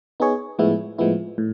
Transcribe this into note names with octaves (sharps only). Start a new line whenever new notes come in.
B3 D#4 G#4 C#5
A2 F3 G#3 B3 E4
A2 F3 G#3 B3 E4
A2